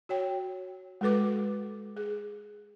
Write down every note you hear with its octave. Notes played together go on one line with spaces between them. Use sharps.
F#4 C#5 G5
G#3 F#4 A4 B4 D6
G#4